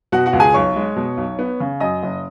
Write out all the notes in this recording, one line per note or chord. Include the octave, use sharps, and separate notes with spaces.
B2 F#4 F#5
F#4 F#5
C#2
G#4 G#5
B1 C#5 C#6
G#3
B2
B1
B3
C#3
F#2 D#5 D#6
F#1